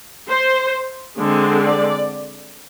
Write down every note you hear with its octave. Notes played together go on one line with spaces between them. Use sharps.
C5
D3 G#3 C4
D5